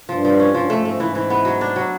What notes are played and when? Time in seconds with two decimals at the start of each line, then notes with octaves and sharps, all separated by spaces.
0.09 G2 F3
0.25 F3
0.40 C#4
0.54 G2 F3
0.70 G2 A3
0.77 G#2
0.85 A3
1.00 G#2 E3
1.15 E3
1.30 B3
1.45 F#3
1.61 D4
1.76 F#3